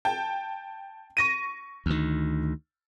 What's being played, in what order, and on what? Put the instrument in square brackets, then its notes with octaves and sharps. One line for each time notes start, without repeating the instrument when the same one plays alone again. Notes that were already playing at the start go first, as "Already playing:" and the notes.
[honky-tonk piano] G5 A5
C#6 A#6 D#7
[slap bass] D2 D#3